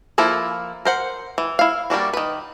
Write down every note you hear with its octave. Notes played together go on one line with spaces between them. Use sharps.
F3 A#3 E4 A4
A#4 C5 F#5
E3
E4 F5
G3 A#3 D4 F#4
D#3 B4